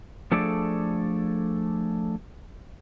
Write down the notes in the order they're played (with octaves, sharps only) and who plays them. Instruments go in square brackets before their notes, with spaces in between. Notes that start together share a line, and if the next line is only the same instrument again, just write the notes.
[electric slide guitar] F3 A3 D4 G#4 A4 D5